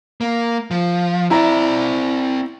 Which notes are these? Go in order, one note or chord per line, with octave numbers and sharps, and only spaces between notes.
A#3
F3
C4 E4 D5 A#5